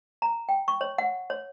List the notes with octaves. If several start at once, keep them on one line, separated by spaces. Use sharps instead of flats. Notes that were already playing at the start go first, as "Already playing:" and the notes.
A#5
G5
C#6
C#5
F#5
C#5